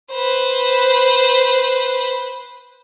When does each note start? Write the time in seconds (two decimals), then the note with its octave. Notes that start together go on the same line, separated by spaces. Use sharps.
0.12 B4 C5